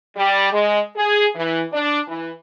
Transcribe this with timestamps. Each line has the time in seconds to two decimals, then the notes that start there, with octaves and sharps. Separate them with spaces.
0.16 G3
0.52 G#3
0.96 G#4
1.35 E3
1.73 D4
2.08 E3